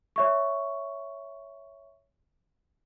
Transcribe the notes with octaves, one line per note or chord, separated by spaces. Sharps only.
C#5 E5 C#6